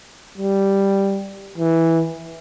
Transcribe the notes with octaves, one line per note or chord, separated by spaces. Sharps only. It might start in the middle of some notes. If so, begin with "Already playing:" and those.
G3
E3